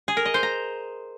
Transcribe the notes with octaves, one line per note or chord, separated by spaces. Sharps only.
G#4
A#4
D#5
C5
A#5